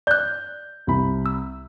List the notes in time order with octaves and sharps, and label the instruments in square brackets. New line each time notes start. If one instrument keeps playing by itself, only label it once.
[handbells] D5 F#6 [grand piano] G6
[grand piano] C2 B5
[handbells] E6